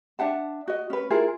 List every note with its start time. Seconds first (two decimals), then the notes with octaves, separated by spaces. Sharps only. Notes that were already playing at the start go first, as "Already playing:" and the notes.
0.19 D4 E5 F#5 A5
0.68 F#4 D#5
0.90 C#4 B4
1.10 E4 F4 G#4 A#4